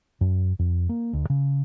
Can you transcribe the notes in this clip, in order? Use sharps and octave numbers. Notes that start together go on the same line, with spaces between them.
F#2
F2
A#3
D2
C#3